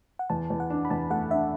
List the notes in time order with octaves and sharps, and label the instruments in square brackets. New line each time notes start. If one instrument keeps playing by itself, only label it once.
[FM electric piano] F#5
[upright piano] E2 [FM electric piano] A5
[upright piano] E2
[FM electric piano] F#5
[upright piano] D4
[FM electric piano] B5
[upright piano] E2 [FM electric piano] A5
[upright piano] A3 [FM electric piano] F#5
[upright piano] D4 [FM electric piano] E5